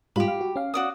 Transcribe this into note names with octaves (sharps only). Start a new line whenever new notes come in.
G#2 G3 F4 G4 B5
F5
F#4
C#4 F5
F#4 D5 D#6